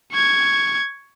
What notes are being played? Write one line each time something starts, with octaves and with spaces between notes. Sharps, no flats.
C#6 G#6